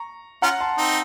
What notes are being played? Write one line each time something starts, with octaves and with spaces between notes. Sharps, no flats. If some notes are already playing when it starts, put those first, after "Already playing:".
Already playing: A#5 C#6
C#4 F4 F#5 A#5
A5 C6
C4 D#4